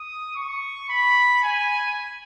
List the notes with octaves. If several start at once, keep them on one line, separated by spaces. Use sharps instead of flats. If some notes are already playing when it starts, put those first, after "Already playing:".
Already playing: D#6
C#6
B5
G#5